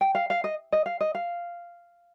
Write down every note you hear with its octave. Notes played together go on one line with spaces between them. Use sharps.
G5
F5
F5
D#5
D#5
F5
D#5
F5